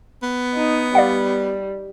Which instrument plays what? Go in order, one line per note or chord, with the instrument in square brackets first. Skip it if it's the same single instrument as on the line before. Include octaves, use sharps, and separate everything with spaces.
[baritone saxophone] B3
[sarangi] D#4
[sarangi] G3 [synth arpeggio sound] D5 F5 F#5